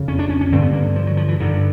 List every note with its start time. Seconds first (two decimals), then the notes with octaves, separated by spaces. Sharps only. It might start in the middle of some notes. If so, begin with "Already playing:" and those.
Already playing: F2 C#3
0.08 C#4
0.19 D4
0.30 C#4
0.41 C#4
0.52 G2 D3 C4
0.62 B3
0.73 A#3
0.96 F3
1.07 F#3
1.17 F3
1.28 E3
1.40 G2 D3 D#3